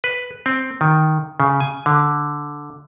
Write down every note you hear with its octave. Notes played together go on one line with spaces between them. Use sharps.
B4
C4
D#3
C#3
G#5
D3